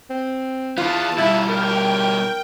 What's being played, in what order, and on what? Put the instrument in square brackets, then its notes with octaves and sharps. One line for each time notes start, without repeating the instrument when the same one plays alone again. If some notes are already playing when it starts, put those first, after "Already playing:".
[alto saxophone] C4
[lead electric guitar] E3 B3 [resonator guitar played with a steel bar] F4 [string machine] A5
[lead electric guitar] B2 G3 [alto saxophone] E4
[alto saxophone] A#4 [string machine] G5